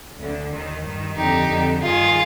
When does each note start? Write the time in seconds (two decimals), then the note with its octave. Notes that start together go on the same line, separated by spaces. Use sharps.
0.17 D2 D3
0.51 D#2 D#3
0.83 G2 D#3
1.16 F2 D3 D#4 G4
1.48 F2 D3
1.81 G2 D#3 F4 G#4